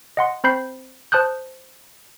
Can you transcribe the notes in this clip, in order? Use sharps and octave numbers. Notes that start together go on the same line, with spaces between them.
D#5 F#5 C6
C4 C5 B5 G6 C7
C5 A5 D#6 F#6 G6